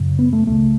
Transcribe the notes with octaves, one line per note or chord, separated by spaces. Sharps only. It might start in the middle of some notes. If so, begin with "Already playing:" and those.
Already playing: F#2 C#3
B3
A3
C#2 C#3 A3